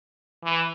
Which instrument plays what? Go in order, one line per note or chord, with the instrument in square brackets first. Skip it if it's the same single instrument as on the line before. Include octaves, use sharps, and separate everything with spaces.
[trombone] E3